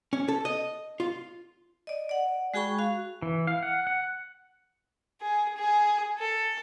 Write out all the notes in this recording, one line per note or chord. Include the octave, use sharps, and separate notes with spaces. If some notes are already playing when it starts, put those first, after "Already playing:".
C#4
A4
D#5
F4
D5 D#5
D5 F#5
G#3 F#4 G#4 G5 B5 C#6
F#4 F5
E3
F5
F#5
F#5
G#4
G#4
A4